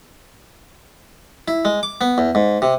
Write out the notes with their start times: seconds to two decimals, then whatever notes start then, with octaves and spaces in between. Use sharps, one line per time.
1.48 E4
1.65 G#3
1.83 D6
2.01 B3
2.18 E2
2.35 G#2
2.62 C3